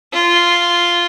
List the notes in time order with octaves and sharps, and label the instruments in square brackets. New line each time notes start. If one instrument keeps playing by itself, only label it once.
[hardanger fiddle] F4